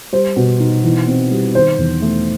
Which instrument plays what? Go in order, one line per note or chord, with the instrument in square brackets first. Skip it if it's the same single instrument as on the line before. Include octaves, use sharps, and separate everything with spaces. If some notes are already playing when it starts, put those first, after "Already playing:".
[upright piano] G3 C5
B2
D#4
E3
C4
G3
D#3 C5
E2
A3